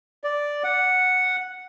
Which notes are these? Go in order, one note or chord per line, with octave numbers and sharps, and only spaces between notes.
D5
F#5